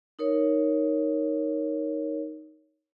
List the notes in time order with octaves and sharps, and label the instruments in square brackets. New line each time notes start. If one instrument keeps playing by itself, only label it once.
[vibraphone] D#4 A#4 C#5